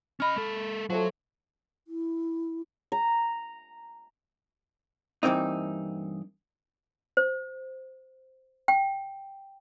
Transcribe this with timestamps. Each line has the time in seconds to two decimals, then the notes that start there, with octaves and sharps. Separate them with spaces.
0.20 C#4 D#5 B5 F6
0.36 G#3 A4
0.90 F3 F#3 A3 A4
1.88 E4
2.92 A#5
5.23 G2 E3 F3 A#3 C4 D#4
7.17 C5
8.68 G5